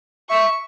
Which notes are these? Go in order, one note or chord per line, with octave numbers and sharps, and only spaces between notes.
E5 C#6